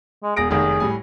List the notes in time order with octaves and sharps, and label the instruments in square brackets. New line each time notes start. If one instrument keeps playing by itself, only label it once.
[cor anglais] G#3
[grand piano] E1 A#6 D7 [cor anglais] G#4
[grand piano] F1 D#3 [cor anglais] G#4
[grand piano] A2 G3 G#5